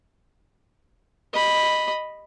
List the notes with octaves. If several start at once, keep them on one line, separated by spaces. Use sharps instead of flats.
D#5 B5